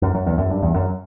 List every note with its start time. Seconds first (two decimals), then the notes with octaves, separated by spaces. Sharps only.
0.02 F#2
0.14 F#2
0.26 E2
0.38 F#2
0.51 G2
0.62 E2
0.74 F#2